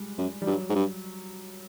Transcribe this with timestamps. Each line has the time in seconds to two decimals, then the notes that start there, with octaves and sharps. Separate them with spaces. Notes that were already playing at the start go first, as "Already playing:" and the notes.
Already playing: G3 G#3
0.18 F#2
0.42 G3
0.46 G2 F#3
0.70 G#2
0.75 G2